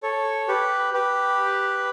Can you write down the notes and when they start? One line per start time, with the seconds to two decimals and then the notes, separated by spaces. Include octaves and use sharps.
0.03 A4 C#5
0.48 G4 B4
0.94 G4 B4